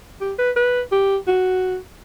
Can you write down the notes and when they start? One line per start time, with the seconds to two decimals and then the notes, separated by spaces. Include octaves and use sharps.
0.20 G4
0.38 B4
0.56 B4
0.92 G4
1.27 F#4